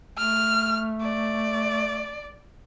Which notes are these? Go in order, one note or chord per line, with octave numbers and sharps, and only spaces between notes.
A3 F6
D5